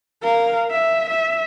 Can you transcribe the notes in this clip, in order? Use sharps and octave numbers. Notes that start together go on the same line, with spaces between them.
A#4 F5
E5
E5